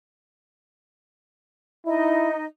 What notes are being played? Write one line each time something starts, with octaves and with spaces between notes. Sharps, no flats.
D#4 E4 D#5